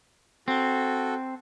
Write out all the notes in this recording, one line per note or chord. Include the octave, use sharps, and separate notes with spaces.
C4 F#4 A4